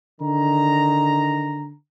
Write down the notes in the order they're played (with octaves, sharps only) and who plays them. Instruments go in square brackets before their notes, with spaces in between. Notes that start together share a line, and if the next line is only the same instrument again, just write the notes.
[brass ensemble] D3 D#3 A#5